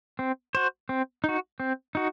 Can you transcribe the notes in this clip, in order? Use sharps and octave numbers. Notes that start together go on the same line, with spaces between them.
C4
F#4 C5
C4
D#4 F#4
C4
D#4 F#4